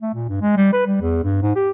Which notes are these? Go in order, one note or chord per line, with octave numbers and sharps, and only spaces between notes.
A3
A#2
G2
G#3
G3
B4
G3
E2
G2
G#2
G4